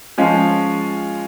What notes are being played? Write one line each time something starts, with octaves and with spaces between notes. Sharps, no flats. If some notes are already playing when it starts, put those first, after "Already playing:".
F3 G#3 C#4 F4